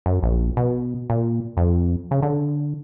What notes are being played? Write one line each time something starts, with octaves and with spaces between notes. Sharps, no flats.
F#2
A#1
B2
A#2
F2
C#3
D3